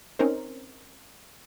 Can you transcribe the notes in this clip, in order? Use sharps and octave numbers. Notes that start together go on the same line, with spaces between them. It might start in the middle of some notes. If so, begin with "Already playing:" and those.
C4 C#4 D#4 A#4 C5